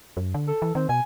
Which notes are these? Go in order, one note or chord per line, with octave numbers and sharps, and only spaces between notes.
F#2
D3
A4
E3
D#3 C4
B2 G#5